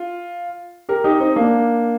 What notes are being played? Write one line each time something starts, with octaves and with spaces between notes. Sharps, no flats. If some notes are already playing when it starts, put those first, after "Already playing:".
Already playing: F4
G4 A#4
D#4 G4
C4 D#4
A#3 D4